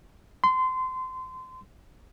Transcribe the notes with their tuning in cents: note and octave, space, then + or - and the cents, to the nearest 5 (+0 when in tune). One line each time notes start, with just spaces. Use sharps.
C6 -25